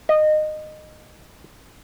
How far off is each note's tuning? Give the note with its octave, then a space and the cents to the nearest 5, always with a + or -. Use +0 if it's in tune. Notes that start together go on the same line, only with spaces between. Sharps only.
D#5 -20